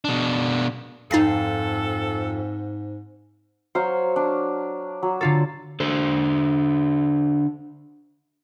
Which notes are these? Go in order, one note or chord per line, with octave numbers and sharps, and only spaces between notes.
B2 D4
F2 G#2 D#4 A4 A6 C7
F#3 C5 C#5 F5
D4
F#3
D3 F4 A4
D3 A4 C5